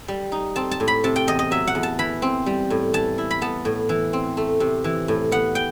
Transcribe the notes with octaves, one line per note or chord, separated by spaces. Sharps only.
G3
D#4
C4 A5
A5
A2
B5
C3 A5
G5
E2 D#5
D#5
F#3 E5
F#5
E2
A5
E3 B5
C4
G3
A2
E3 A5
E4
B5
B3 A5
A2
E3
C4
A3
C3
E3
A2
B3 F#5
G5